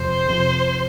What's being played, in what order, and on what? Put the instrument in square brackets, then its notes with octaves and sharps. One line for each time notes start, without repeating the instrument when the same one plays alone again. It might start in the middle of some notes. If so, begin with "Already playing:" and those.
Already playing: [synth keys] F2 C3 F3 [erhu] C5
[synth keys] F2 C3 F3